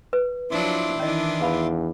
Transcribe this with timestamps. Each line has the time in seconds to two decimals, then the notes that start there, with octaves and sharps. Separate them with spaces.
0.13 B4
0.51 F3 F#3 D4 E4 C6 D6
1.00 D#3 E3 C#4 D4 D#5
1.41 E2 B4 F5 B5